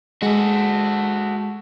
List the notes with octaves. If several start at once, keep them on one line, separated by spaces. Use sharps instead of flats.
G#3 F#4 A4